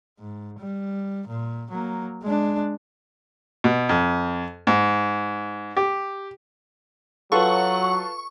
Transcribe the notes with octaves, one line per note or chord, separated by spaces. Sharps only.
G#2
G3
A#2
F#3 A#3
G#3 D4
B2
F2
G#2
G4
F#3 F4 A4 B4 F#5 C#6